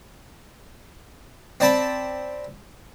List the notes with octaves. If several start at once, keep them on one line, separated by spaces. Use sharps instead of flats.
C4 D5 A5 B5